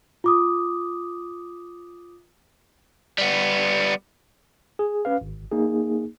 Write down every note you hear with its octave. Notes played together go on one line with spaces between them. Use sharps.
F4 D6 D#6
G3 B3
G#4
C#4 B4 F5
G#1
A#3 D#4 G#4